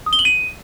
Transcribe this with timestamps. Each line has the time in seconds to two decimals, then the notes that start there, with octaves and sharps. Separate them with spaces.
0.06 D#6
0.13 G7
0.19 F#7
0.25 D#7